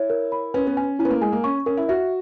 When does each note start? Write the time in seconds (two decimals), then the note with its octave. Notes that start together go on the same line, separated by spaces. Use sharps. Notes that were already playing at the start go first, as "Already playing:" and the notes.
Already playing: E4 C#5
0.10 A#4
0.32 B5
0.54 C#4 B4
0.67 B3
0.77 C#4 G#5
0.99 C#4 E4
1.05 B3
1.10 A#3
1.21 G#3 G#5
1.32 A#3
1.44 C#4 C#6
1.66 C#4 A#4
1.77 E4
1.89 F#4 E5